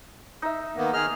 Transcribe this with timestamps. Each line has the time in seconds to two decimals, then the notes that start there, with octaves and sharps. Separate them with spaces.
0.42 D#4 E5
0.77 D#3 A#3 B3
0.93 D#3 G#4 D#5 F6